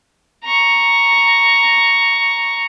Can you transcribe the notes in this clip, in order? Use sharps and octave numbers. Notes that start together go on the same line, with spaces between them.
A#5 C#6